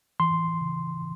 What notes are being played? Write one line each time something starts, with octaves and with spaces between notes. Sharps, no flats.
E3 C6
C#3